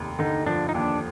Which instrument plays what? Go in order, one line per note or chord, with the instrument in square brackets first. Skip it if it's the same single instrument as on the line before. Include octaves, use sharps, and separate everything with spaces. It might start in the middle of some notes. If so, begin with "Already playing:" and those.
Already playing: [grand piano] F1 D#2
[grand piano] D3 [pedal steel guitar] D#4
[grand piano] F3 [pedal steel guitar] D4
[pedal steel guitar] D#4
[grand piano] D#2 [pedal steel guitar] D4